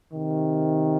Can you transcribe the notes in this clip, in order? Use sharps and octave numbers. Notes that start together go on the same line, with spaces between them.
C3 D#3